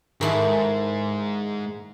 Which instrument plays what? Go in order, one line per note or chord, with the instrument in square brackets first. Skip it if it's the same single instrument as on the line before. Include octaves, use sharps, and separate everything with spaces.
[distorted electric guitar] G#2 [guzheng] D#3 E4 A4